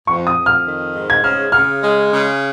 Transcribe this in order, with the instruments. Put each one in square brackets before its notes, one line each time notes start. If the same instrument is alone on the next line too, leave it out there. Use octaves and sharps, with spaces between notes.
[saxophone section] F2 [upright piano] C#6
[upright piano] D#6
[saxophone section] F2
[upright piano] F6
[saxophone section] D#3
G#2
[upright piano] G#6
[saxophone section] C#3 [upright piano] F6
[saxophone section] C#3 [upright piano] F6
[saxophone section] G#3
C#3